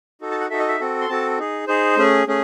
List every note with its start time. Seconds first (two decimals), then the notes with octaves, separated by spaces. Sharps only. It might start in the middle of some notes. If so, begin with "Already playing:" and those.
0.21 D#4 F#4 A4
0.31 A5
0.41 F#5
0.50 D#4 F#4 A4 E5
0.59 D#5
0.68 E5
0.80 C4 F#4 A4
1.01 C6
1.09 C4 F#4 A4 A5
1.39 D#4 G#4
1.67 D#4 G#4 C5
1.97 A3 C#4 G#4
2.27 A3 C#4 G#4